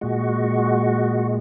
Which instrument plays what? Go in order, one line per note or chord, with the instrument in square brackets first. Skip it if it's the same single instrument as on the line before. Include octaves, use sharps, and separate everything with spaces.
[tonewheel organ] A#2 G#3 F#4